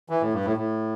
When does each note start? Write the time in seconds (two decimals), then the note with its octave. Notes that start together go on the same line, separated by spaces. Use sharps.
0.09 E3
0.21 A2
0.33 G2
0.45 A2
0.57 A2